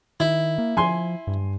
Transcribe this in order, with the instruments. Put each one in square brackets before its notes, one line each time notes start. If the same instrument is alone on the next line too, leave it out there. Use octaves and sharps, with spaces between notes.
[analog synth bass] D#3 [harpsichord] E4
[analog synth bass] A#3
[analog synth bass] F3 [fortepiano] G#5 C6
[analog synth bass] G2